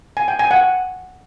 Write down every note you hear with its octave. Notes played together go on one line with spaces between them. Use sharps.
G#5
G5
G#5
F#5